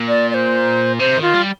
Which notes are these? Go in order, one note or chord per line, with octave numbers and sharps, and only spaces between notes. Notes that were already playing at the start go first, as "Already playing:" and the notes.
Already playing: A#2
D5
D5
C5
C3 C5
D#3 F4
G3